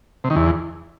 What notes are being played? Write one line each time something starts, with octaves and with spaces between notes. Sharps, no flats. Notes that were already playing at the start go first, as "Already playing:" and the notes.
C3
D#3
E2